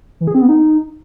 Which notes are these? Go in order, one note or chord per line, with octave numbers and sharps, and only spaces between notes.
E3
G#4
C4
B3
D#4